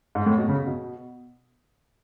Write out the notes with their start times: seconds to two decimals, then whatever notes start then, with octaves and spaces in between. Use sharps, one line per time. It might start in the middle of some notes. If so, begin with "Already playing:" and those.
0.15 G#2
0.26 A2
0.38 B2
0.49 C#3
0.66 B2